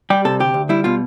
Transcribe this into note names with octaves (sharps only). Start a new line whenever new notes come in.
G3 G4
C3 A4
D2 G4
D2
G3 E4
B2 F4